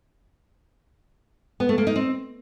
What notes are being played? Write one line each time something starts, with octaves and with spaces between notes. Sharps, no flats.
B3
A3
A#3
D#4
C4